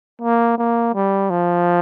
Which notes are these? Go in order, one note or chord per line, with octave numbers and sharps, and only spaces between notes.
A#3
A#3
G3
F3